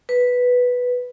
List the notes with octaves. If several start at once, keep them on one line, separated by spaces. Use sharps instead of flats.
B4